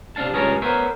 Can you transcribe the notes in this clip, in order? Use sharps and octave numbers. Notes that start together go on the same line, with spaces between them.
C3 D4 F5 A5
C#2 G2 G#4 A#4 C#5 A5
B3 A#4 C5 C#5 E5